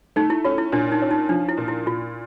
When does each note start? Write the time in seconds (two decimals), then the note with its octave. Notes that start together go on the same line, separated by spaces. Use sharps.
0.16 A3 D#4
0.30 E4
0.45 C#4 F4
0.58 E4
0.72 A#2 D4
0.92 D#4
1.02 C#4
1.11 D#4
1.29 F3 D4
1.49 E4
1.58 A#2
1.68 E4
1.86 A#2 F4